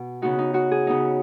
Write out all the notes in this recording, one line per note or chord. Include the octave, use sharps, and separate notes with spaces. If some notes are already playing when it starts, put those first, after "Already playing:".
Already playing: B2
C#3 B3 D#4 F#4
D#4
F#4
G#4
C#3 B3 D#4